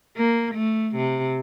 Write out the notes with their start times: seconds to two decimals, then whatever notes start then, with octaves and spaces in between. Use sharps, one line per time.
0.17 A#3
0.54 A3
0.96 C3